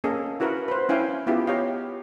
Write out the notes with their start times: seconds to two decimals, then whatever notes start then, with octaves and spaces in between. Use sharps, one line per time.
0.04 A#3 C#4 G#4 A4 D#5
0.40 E4 F#4 A#4 B4 F#5
0.68 B4 C5
0.89 C#4 E4 F5 G5 G#5
1.27 B3 E4 F4 G4 G#4
1.47 G4 C#5 D#5 F5